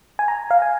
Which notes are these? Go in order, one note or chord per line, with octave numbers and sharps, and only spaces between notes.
G#5
A#5
F5
G#5